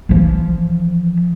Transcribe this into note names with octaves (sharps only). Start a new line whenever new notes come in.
E3 F3